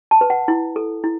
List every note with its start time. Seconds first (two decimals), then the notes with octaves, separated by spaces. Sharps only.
0.11 A5
0.21 B4
0.30 F#5
0.48 E4
0.76 A4
1.04 E4